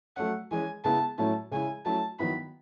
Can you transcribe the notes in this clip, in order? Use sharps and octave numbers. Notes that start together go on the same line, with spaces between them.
F#3 A3 C#4 F#5
E3 G#3 C#4 G#5
C#3 G#3 B3 E4 A5
A2 F#3 A3 C#4 E4 A5
C#3 G#3 C#4 E4 G#5
F#3 A3 C#4 E4 A5
D#3 F#3 B3 E4 B5